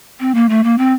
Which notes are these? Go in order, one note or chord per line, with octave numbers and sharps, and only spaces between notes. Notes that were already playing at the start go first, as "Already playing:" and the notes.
C4
A#3
A3
A#3
C4